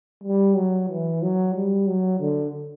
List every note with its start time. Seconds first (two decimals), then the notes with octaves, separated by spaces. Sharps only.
0.24 G3
0.56 F#3
0.90 E3
1.22 F#3
1.55 G3
1.87 F#3
2.20 D3